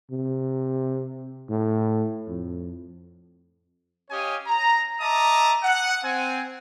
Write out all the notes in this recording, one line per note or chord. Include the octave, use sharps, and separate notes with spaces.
C3
A2
F2
C#4 G4 C#5 D#5 F5 G#5
A#5
D#5 E5 A5 A#5 D6 D#6
F#5
C4 G#5